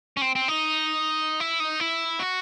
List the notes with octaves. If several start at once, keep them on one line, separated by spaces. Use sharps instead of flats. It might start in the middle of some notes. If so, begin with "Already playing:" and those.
C#4
C4
C4
D#4
E4
D#4
E4
F#4